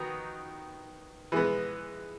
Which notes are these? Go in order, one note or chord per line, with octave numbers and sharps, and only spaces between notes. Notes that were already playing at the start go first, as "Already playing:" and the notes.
Already playing: D#3 B3 D#4 F#4
E3 G#3 B3